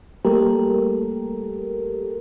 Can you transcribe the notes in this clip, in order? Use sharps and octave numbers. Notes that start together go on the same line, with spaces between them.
G3 A3 A#3 G4 A4 A#4